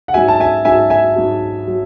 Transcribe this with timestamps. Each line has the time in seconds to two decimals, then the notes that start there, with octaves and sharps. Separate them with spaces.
0.08 F#5
0.14 G#2 F#3 E5 G#5
0.28 A5
0.40 E5 G#5
0.65 G#2 F#3 E5 G#5
0.90 E5 G#5
1.16 G#2 F#3
1.67 F#3